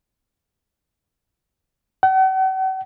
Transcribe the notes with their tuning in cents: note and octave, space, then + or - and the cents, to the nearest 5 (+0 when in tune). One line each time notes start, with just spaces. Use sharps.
F#5 +45